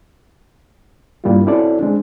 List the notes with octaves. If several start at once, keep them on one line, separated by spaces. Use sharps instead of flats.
G2 G3 A#3 D4 E4 F4
C4 C#4 E4 F#4 A4 D5
G#3 C4 D4